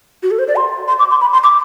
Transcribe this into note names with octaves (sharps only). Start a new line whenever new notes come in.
F#4
A4
C5
D5
C6
C6
D6
C6
B5
C6
D6